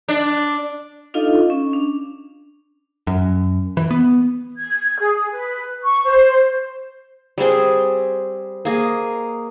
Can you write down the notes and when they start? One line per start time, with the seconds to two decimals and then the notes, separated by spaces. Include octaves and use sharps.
0.09 D4
1.14 D4 D#4 F4 A4 D#5 F5
1.50 C#4
1.73 D4
3.07 F#2
3.77 E3
3.91 B3
4.58 G#6
5.00 G#4
5.32 B4
5.83 C#6
6.03 C5
7.38 G3 C4 G#4 C6
8.65 A#3 G#4 D#5